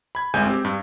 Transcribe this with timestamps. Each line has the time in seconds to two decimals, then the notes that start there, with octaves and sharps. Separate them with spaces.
0.15 B5 G#6
0.34 G1 C2 G#3 G#5 G6
0.46 C4 G4
0.65 G2